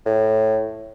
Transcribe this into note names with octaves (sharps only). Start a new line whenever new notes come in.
A2